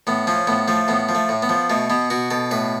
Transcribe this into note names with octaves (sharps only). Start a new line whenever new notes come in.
A2 B3
F3 C#4
A2 B3
F3 A3
A2 B3
F3
A3
A2
B3
F3
B2 A3
B2 B3
B2 F#4
B2 A4
A2 B4